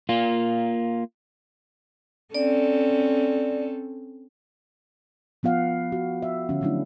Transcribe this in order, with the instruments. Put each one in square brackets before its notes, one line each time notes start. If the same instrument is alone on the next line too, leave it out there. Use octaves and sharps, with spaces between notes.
[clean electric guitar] A#3 F4
[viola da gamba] C4 C#4 A4 [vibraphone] D5
[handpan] F3 B3 F4 F5 F#5
F#4
E5
D3 F3 C#4
F#3 A3 C#4 D4 E4